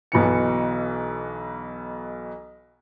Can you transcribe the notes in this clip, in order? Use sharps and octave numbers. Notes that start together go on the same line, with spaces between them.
B1 B2 E3 C#7